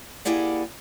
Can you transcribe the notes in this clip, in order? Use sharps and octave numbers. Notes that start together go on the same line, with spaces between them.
A#3 E4 G4 G#4 D5 F#5